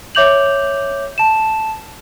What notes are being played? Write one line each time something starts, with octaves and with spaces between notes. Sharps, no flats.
C#5 E5 D6 G6 F7 F#7
A5 E7